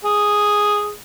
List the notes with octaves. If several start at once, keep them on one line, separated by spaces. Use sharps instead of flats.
G#4